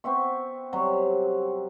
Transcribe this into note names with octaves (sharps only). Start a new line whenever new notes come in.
B3 C4 E5 C#6
C3 F#3 G3